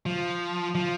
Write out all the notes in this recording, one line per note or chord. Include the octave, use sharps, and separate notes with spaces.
F3
F3